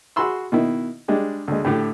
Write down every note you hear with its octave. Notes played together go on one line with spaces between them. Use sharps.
F#4 G#4 B5 C6 E6
B2 D#3 E4
G3 G#3 D4
D2 G#3
A2 D3 A3 G4